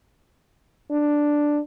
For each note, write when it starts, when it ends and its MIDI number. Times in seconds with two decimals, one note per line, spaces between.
0.91 1.60 62